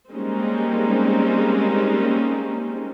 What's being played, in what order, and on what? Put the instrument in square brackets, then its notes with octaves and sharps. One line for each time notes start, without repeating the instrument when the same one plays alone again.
[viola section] G3 G#3 A#3 C4 C#4 D#4